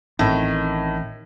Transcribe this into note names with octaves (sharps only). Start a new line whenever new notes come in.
A1 A2 D#3 C4